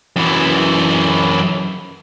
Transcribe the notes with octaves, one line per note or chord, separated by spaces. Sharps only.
F#2 E3